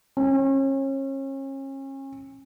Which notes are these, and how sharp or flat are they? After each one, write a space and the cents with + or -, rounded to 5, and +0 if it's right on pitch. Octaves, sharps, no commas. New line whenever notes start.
C#4 -35